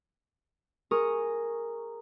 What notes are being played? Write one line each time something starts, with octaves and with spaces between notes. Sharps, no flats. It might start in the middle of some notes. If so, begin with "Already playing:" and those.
G#4 A#4 A#5 C#6 D#6